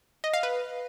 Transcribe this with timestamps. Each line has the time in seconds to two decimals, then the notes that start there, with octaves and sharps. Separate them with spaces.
0.24 D#5
0.33 F5
0.43 B4